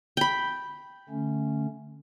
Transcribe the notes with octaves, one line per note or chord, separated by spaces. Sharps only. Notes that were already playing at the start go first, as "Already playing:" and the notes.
G5 B5
D3 A3 C#4